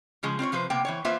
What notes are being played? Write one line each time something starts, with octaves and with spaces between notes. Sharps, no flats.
C#3 F3 G#3
C4 F4 C5 C#5
C3 F3 B4 C5
C3 A#3 B3 G5
E3 C5 C#5
A#3 F4 B4 C5 E5